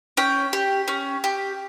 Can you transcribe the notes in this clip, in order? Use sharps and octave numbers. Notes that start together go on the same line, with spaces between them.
C#4 G5
G4
C#4
G4